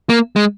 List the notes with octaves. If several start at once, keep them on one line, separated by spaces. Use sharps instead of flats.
A#3
G#3